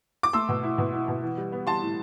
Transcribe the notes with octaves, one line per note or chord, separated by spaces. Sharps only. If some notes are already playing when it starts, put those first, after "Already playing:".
D6
A3 C6 E6
B2
E4
B2
E4
B2
E3
G3
B3
G3 A5 C6
A2